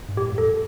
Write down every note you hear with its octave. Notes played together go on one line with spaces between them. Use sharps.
G2
A2 G4
G2
F2 A4